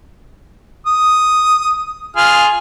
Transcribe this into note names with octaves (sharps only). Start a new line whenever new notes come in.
D#6
F4 G#4 F6